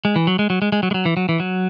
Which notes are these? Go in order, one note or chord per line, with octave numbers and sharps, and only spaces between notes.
G#3
E3
F#3
G#3
F#3
G#3
G#3
F#3
G#3
F#3
E3
F#3
E3
F#3